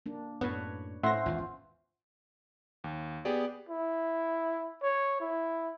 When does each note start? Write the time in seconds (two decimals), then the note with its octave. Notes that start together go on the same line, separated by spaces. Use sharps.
0.06 A#3 D4
0.41 F#2 A2 B3 D4 B4 C#5
1.03 A2 C#4 C5 E5 F#5 C6 A#6
1.26 G#1 E2 E3 F4
2.84 D#2
3.25 B3 G4 G#4 D5
3.69 E4
4.82 C#5
5.20 E4